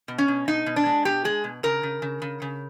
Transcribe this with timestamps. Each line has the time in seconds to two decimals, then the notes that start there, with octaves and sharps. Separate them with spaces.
0.08 B2
0.18 C#4
0.28 B2
0.48 B2 D#4
0.66 B2
0.76 D4
0.86 G#3
1.05 B2 G4
1.25 G#3 G#4
1.44 B2
1.63 C#3 A#4
1.83 C#3
2.02 C#3
2.22 C#3
2.42 C#3